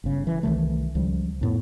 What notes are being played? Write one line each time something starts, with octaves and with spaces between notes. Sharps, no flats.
G1 C#3
E3
C2 D#3 E3 A3
C#2 F3 G3
F2 A2 B3